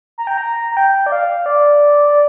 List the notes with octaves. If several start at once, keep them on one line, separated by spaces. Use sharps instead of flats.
A#5
G5
A#5
A#5
G5
D5
F5
D5